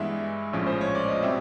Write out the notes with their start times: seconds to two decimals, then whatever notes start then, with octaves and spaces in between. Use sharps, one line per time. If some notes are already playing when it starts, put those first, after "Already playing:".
Already playing: G2 E3 G#3 B3 E5
0.53 A#1 A2 F3 G#3 C#4
0.66 C5
0.81 C#5
0.95 D5
1.08 D#5
1.22 B2 G3 C4 E5